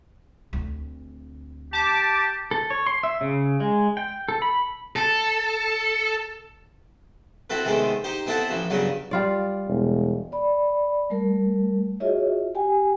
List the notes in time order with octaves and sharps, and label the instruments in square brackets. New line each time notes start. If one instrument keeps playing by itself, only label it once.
[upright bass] D2 C4
[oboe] G4 [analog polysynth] A5 D6
[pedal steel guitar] A4
C#5
C6
E5
C#3
G#3
G5
A4
B5
[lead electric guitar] A4
[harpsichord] C4 E4 F#4 A4 B4
C3 D#3 G#3 A3 B3 C4
D#4 G4 C5
B3 C4 E4 A4 F#5 A5
A1 E3 F3
G2 C#3 F#3 B3
[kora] G3 F4 D5
[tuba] E1
[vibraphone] D5 B5
G3 A3 A#4
F4 F#4 G#4 C#5 D#5 E5
G4 G5 G#5